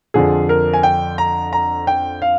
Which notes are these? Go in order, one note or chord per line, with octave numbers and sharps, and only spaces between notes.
F2 D3 F3 G#4
A#4
G#5
G5
A#5
A#5
G5
F5